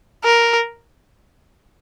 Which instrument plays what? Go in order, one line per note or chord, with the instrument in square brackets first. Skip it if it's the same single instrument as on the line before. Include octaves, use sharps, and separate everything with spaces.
[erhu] A#4